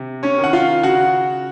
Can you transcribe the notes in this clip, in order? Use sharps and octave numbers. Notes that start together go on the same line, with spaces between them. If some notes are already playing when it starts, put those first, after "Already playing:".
Already playing: C3
C#4 C#5
D#3
F#5
F4 F5
C#3 F#4 F#5